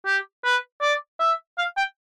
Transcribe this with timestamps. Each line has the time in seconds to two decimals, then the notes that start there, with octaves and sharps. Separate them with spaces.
0.06 G4
0.44 B4
0.81 D5
1.20 E5
1.58 F5
1.77 G5